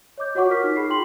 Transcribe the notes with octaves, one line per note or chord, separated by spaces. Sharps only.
C#5 D#5 D6 G6
F4 F#4 C#5 F#5 C#6 D6
A#4 F6 B6
D#4
G#4 B5 C7
F4 G5 C6 F#7